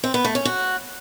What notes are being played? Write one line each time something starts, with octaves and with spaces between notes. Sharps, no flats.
C4
B3
A3
C#4
F#4